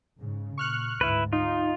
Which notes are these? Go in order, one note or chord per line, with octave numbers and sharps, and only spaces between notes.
G#2 C#3
A#2 C#6 F6 F#6
D2 G#2 E4 B4
D#4 F4